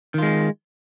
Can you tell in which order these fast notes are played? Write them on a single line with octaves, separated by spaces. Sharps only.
D#3 F4 G#3